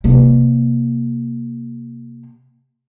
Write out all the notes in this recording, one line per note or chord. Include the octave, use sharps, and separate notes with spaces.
C3 A#3